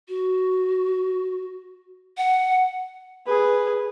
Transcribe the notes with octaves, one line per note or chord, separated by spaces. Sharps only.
F#4
F#5
G#4 B4